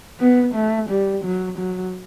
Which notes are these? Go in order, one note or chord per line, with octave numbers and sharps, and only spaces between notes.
B3
A3
G3
F#3
F#3